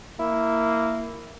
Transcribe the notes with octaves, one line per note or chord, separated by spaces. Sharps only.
A#3 E4